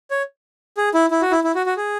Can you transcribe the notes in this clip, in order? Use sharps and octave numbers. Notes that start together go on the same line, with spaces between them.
C#5
G#4
E4
E4
F#4
E4
E4
F#4
F#4
G#4